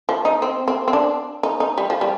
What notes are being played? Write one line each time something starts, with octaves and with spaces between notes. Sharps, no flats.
F3
D#4
C4
C4
C4
D4
D#4
D#4
G3
F3
G3